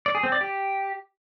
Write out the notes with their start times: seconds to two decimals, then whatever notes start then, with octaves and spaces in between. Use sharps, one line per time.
0.06 D5
0.15 G#4
0.23 C4
0.32 D5
0.41 G4